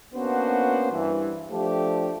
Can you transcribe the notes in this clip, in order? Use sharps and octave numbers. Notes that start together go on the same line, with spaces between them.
A#3 B3 C#4 D4 F#4 C5
G2 E3
F3 A3 D4 G4